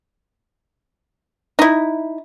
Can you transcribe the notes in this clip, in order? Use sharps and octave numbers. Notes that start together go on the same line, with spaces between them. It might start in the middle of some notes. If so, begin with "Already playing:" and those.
D#4 E4